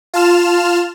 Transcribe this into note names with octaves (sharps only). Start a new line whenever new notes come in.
F4 A5 F6 E7